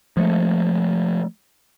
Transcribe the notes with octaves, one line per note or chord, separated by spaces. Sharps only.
F3 G#3 A3